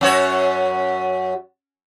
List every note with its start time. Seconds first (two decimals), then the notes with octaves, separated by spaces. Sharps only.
0.01 F#2 F#4 C#5